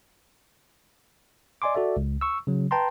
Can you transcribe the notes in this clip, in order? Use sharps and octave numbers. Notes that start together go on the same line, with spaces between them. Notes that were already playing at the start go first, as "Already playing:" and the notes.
D5 D#5 G#5 C6 D6
F#4 A4 D5 E5
C#2
C#6 E6
C#3 F#3
B4 G5 A5 A#5 C6